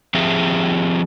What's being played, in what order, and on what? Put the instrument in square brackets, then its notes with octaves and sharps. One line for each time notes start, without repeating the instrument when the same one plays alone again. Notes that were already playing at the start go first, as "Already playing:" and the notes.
[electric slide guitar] F3 C4 F4 G4 G#4 E5